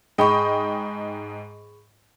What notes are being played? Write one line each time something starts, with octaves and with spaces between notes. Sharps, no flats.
G#2 G#4 D#5 G5 B5 C#6